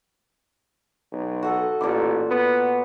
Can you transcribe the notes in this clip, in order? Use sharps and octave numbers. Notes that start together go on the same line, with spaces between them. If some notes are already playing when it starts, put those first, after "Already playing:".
B1
F#4 A4 D#5
A1 A#2 A4 D6
B3